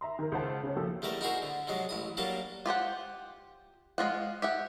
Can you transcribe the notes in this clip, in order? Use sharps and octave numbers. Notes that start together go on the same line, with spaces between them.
E5 A#5 C6
D#3 A#4
C#2 C5 F#5 A5
C#3 C#4
F3 G3 A#3 F#4 G4 A4
E2 G3 A3 A#4 E5
D#4 E4 F#4 G#4 A#4 C5
D3
G#2 C3 F#3 G#3
A1 E4 D#6
F#3 G3 A#3 D4 A4
F4 G4 C5 F#5
G#3 C#4 F4 F#5
G4 E5 F#5